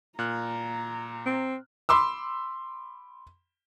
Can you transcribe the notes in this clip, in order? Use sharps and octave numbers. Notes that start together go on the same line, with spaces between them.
A#2 A#5 F6 F#6
C4
B5 C6 D6 E6